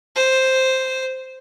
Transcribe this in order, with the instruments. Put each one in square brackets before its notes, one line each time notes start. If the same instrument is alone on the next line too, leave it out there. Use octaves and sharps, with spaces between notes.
[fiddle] C5